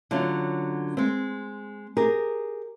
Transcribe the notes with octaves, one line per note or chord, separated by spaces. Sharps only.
D3 F#3 C#4 F4
G#3 C4
G4 G#4 A#4